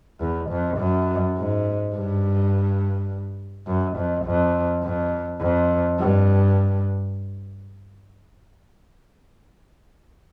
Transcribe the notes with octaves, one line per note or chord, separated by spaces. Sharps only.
E2
F2
F#2
G#2
G2
F#2
F2
F2
F2
F2
G2